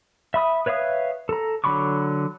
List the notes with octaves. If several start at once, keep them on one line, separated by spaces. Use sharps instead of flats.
E5 B5 D#6
B4 C#5 E5 F5 D#6
A4 A#5
D3 F#3 B5 C#6 D6